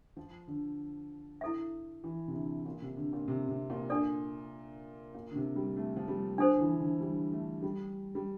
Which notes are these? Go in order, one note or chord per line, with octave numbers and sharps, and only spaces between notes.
F3
D3
E4 A4 E5
E3
C3
D3
A#2
C3
D3
A#2
C3
C3
A#2
D4 A4 D5
A#2
D3
C3
G3
A3
F3
G3
F3 D4 A4 C5
D3
E3
D3
G3
A3
G3
G3